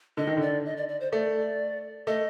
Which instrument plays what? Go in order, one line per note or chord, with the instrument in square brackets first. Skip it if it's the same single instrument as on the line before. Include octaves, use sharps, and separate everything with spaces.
[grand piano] D3 [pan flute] D#5
[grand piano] D#3
[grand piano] D3 [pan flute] D5
[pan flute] D#5
D5
D5
C5
[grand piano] A3 [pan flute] D5
[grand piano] A3 [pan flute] D#5